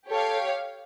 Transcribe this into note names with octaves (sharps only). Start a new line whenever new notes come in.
G4 A4 C#5 F5